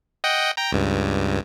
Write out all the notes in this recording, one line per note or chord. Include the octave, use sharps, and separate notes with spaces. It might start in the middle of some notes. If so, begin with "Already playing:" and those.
D#5 F#5 G5
G5 A#5
C#2 G2